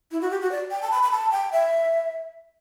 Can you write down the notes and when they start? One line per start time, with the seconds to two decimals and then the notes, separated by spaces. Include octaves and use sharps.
0.11 E4
0.21 F#4
0.31 G4
0.41 F#4
0.51 D5
0.71 G5
0.82 A5
0.92 B5
1.03 B5
1.11 A5
1.31 G5
1.52 E5